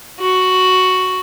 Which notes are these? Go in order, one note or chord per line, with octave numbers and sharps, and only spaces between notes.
F#4